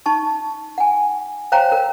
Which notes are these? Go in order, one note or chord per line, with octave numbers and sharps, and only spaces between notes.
D#4 A5 C#6
F#5 G#5
C5 C#5 F5 G5 A#5
A#4